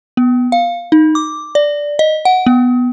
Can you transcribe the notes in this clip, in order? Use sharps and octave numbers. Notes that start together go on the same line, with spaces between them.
B3
F5
D#4
D6
D5
D#5
F#5
B3